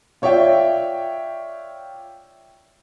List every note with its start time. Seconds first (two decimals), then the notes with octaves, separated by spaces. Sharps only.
0.22 F4 C#5 D5 E5 G5